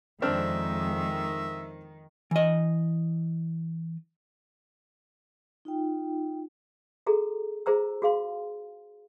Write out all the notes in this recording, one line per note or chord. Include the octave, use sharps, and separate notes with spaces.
F2 D#3 G#3 C4 D4 E5 F6
E3 D#5
D#4 F4 G5
F#4 G#4 A4 A#5
F4 G#4 C5 A#5 E6
F#4 G#4 F5 C6